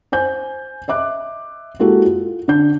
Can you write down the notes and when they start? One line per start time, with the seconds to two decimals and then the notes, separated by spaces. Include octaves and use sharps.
0.12 C5 G#5 G6
0.88 D#5 E5 D6 F#6
1.80 G#3 A#3 E4 F#4 G4 A4
2.05 F4
2.48 D3 D4 G6